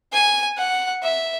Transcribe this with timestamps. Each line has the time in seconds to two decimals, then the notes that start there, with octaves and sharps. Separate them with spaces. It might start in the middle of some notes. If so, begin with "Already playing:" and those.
0.13 G#5
0.58 F#5
1.03 E5